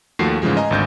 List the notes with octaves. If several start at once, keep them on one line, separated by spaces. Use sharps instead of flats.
D#2 F3 A3 F#4 C7
G#2 C#3 E3 F3 G#3
D#5 G#5 A#5
G#1 D2 G6